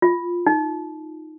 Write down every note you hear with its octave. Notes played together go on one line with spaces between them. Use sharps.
F4
D#4